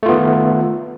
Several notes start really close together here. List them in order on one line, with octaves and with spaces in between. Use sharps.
A3 F4 B3 D#3